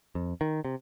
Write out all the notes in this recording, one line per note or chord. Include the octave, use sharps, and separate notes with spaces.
F2
D#3
C3